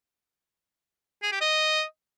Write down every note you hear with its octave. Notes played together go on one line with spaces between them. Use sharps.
G#4
G4
D#5